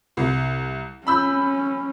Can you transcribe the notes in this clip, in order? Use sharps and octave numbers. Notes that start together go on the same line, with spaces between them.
C2
C#4 B5 E6 G6